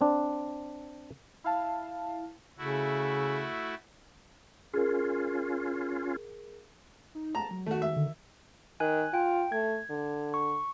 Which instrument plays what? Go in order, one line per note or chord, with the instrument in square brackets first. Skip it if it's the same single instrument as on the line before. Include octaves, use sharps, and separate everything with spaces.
[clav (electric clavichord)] C4 D4
[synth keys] E4 F5 A5
[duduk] C#3 [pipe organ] A3 E4 F#4
[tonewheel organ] C#4 F4 [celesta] G#4 A#4
[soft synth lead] D#4
[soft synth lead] A5 [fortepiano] A#5
[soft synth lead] F#3
[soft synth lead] D#3 [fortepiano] A3 F#4
[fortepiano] E5
[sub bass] D3
[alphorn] D#3 [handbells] G#5 F#6
[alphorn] F4 [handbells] G5
[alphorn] A3 [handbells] G#6
[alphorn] D3
[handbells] C#6